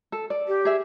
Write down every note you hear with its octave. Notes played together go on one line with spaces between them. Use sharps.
A4
D5
G4
G#4 E5